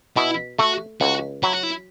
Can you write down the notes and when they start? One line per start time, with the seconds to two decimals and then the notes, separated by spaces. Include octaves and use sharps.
0.16 B2 E4
0.59 A3 F#4
1.01 C#2 F#4
1.43 F#3 E4
1.53 F#4
1.63 E4